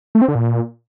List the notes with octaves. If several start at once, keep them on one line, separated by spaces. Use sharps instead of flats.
A3
C4
D3
A#2